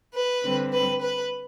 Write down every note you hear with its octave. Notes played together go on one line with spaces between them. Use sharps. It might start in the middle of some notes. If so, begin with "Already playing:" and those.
B4
D3 G3 C4
B4
B4